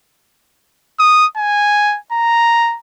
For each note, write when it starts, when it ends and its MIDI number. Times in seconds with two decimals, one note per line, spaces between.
0.99 1.26 87
1.37 1.98 80
2.12 2.77 82